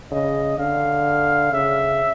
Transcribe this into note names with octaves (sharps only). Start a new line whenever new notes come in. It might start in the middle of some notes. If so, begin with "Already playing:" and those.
C#3 D#5
D3 F5
C#3 E5